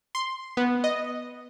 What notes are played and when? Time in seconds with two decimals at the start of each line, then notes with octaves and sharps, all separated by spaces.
0.15 C6
0.57 B3
0.84 D#5